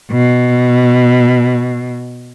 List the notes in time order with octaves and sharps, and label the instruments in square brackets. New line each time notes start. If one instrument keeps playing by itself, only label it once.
[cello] B2